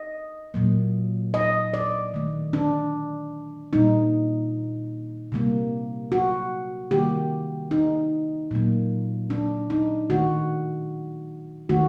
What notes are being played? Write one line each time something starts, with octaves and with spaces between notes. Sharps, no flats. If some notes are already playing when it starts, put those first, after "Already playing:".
Already playing: D#5
A#2 F#3 A#3
D#5
D5
D#3 A3
D4
A#2 G3 A#3 D#4
C3 G3 A#3
F#4
C3 D#3 G3 A#3 G4
D#4
A#2 F#3 A#3
D4
D#4
D#3 A3 F#4
D#3 A3 F#4